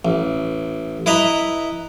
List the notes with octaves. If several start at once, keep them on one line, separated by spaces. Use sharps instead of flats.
A1
E4 B4 D#5 E5 A#5